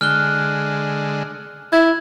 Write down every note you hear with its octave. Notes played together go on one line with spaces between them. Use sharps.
D3 G#3 F6 F#6 G7
E4 G#6